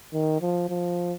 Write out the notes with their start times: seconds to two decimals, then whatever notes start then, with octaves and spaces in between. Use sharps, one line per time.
0.13 D#3
0.41 F3
0.69 F3